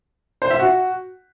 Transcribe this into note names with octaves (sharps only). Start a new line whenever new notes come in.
C5
E5
F#4